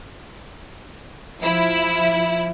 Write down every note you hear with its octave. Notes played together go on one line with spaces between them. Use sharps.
F3 E4